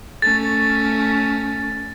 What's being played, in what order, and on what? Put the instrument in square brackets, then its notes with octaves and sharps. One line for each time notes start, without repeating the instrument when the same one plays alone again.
[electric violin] A3 C#4 [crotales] A6